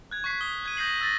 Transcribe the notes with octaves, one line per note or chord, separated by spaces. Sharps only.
F#6 G#6
C#6 F#6 B6 C7
D#6 G7
F#6 G#6 D#7
D#6 G6 A#6 C7 F#7
E6 A6 A#6